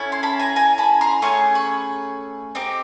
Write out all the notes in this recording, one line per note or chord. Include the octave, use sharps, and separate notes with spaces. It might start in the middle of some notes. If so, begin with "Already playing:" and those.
Already playing: C#4 E4 A4
C6
A5 B5
G#5 A#5
G#5 A#5
A5 B5
A#5 C6
A3 C#4 G#4 C#6
B5 C#6
C4 D#4 G4